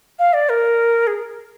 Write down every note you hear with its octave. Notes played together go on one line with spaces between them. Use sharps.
F5
D5
A#4
G#4